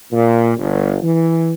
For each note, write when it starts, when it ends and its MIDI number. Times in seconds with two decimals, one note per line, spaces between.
0.12 0.54 46
0.58 0.98 31
1.02 1.53 52